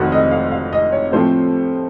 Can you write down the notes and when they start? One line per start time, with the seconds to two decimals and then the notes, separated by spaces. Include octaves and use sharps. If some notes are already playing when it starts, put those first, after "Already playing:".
Already playing: F1 F2 D#3 F#4
0.12 D#5
0.31 F5
0.51 F5
0.73 D#5
0.92 C#5
1.12 A2 F3 A3 C4 C5